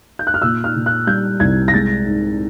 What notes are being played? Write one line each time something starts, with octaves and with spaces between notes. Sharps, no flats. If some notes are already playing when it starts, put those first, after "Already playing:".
G6
F#6
F6
A#2 E6
F6
A#2
F#6
G3 G6
C2 G#6
A#6
G#3 A6
G#2